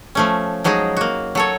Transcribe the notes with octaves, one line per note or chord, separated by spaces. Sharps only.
F3 A3 C#4
F3 F#3 G#3 D#4 G#4
A#3 F#4
F#3 A4 C#5